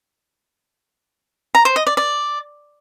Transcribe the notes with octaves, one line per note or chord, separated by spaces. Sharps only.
A#5
C5
D#5
D5
D5